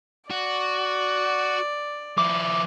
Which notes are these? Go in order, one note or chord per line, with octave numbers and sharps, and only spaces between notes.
F#4 D5
F3 E4 D6